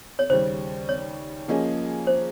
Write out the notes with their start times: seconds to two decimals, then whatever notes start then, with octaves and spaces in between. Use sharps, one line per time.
0.19 C#5
0.30 D#2 C#3 G3 C5
0.89 C#5
1.48 F3 A#3 C#4 G#4 D#5
2.07 C5